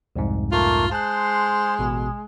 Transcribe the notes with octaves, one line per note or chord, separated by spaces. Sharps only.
C2 F2 G#2
A3 A#3 F4
G#3 C5 A5 C6 F#6
A1 B2